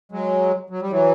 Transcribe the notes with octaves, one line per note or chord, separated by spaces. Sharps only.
F#3 G#3
F#3
G3
E3 F#3